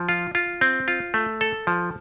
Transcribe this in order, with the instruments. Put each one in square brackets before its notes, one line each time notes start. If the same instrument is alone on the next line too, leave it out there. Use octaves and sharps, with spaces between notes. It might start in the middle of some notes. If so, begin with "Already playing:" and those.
Already playing: [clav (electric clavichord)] F3
F4
F4
C4
F4
A3
A4
F3